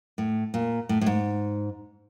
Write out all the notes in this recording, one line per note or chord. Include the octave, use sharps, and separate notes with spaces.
A2
A#2
A2
A2
G#2